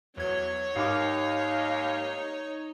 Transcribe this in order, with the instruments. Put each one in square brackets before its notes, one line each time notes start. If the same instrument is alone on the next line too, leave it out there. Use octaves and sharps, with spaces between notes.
[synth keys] E2 G#6 [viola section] F#3 [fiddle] C#5
[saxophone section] D#2 F5 [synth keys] G#2 D6 [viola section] D#4